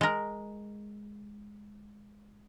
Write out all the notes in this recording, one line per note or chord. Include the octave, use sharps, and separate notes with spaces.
G#3 A#4